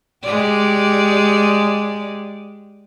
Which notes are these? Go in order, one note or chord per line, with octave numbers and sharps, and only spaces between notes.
G#3 G4 D5